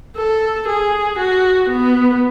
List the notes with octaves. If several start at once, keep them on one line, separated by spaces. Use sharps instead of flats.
A4
G#4
F#4
B3